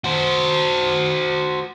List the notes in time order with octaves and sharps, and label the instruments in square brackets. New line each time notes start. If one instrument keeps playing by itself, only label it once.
[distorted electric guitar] F#4 C5